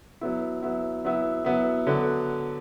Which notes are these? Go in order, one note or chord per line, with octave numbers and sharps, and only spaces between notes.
F#3 B3 E4
F#3 B3 E4
F#3 B3 E4
F#3 B3 E4
D3 F#3 B3